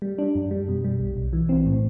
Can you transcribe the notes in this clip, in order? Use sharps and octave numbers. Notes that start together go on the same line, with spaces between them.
G3
D4
F#2
G3
B2
G3
B1
B1
E3
C4
A2